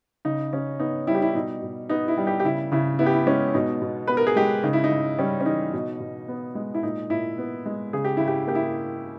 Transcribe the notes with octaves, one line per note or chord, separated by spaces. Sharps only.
C#3 D#4
C#3 C#4
B3 D#4
G3 E4
G4
E4
B2 D#4
B2
B3 D#4
E4
G3
G4
G4
C#3 E4
C#3 E4
B3 E4
G4
E4
G#3 C#4
B2 D#4
B2
B3 B4
A#4
G#4
G#3 G4
C#3 D#4
E4
D#4
C#3
G3 C#4
C#4
E3 D#4
B2
B2
B3
G#3
E4
A#2 D#4
A#2 E4
B3
G#3
C#3 G#4
G4
C#3 E4
G4
A#3 G4
E4